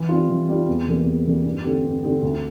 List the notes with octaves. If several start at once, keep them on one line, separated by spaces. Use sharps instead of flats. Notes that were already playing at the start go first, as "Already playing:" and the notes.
Already playing: E3
G3 C4 F4
E3
G3 C4 F4
E2
C3 E3 G3 A#3
E2
C3 E3 G3 A#3
G2
D3 A3 C4 G4
G2
D3 A3 C4 G4
D2